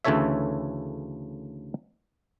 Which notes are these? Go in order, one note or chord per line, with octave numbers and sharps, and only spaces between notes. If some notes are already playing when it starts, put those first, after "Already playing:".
D2 C#3 E3 A4 C#5 E5